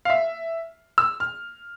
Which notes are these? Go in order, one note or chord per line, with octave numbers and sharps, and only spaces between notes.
F5
E5
E6
F6